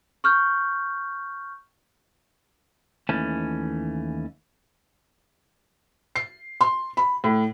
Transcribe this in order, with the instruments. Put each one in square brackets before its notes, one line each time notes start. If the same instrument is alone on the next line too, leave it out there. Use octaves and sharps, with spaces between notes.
[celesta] C#6 F6 G6
[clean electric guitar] D#2 E3 A3 C#4 A5
[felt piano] C7
C6
B5
A2